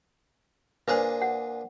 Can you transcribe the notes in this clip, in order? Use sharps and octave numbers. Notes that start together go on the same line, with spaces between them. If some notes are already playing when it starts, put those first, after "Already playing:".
A#2 D4 G#4 B4 C5
F#5